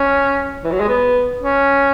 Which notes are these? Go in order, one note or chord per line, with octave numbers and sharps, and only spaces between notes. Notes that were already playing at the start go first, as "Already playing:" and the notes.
Already playing: C#4
E3
F#3
G#3
B3
C#4